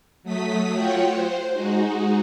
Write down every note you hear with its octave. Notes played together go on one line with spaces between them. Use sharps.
F#3 A3 D#6 B6
F4 F#4 C#5 F#5 G5
C5
G#3 D#4 F#4